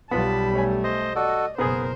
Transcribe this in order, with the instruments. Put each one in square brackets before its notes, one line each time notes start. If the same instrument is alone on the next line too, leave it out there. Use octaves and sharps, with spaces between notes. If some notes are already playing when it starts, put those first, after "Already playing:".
[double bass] B1 G3 [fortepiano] B3 F4 B4 [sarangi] A5 [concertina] B5
[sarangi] A3 [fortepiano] C#5 G#5
[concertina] C5 D#5
[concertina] F#4 A4 [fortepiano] D5 [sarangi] D#5
[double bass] F#1 B2 [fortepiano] B3 G#4 [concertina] A#4 [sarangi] C5